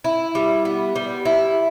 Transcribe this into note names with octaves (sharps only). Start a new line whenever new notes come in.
E4
G3
B3
G3
E4